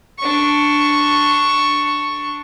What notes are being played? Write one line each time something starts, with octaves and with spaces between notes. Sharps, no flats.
D4 C#6